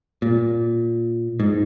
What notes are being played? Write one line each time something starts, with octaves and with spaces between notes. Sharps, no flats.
A#2
G#2